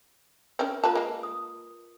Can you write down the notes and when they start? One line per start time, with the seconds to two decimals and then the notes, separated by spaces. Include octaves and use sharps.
0.59 C4 C#4 A#4 B4
0.84 A#3 F4 A#4 B4 A5 A#5
0.95 G#3 A#3
1.23 D#6